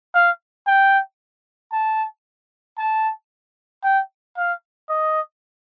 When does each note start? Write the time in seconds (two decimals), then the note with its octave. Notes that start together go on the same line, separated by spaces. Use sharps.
0.15 F5
0.67 G5
1.72 A5
2.78 A5
3.83 G5
4.37 F5
4.89 D#5